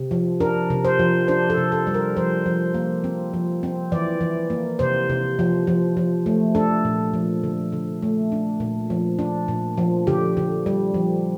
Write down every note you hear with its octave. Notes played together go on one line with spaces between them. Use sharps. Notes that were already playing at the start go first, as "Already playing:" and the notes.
Already playing: C3
F3
D4 A#4
C3
C5
F3
D4 C5
A4
C3
A4
G3
A#4
F3 C5
F3
A#3
C4
F3
C4
E3 D5
E3
A#3
C3 C5
C3
F3
F3
F3
A3
D4 A4
A#2
F3
D3
D3
A3
D4
A#2
F3
D4
A#2
F3
D3 G4
D3
G3
F3